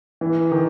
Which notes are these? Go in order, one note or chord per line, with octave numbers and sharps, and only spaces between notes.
E3
D#3